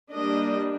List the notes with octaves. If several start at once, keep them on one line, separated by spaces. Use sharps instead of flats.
G3 A#3 D4 D#5